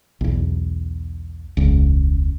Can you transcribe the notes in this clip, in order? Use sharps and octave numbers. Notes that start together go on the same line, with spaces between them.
B1 E2
E1 C#2